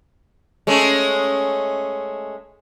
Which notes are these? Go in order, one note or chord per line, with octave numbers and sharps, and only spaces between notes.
G#3 A3 C#4